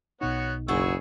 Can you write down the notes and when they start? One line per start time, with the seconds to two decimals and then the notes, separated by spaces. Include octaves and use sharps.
0.21 B1 B2 B3 D#4 F#4 C#5
0.68 F#1 C#3 F#4 G#4 C#6 E6